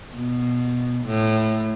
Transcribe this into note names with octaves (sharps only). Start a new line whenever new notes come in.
B2
A2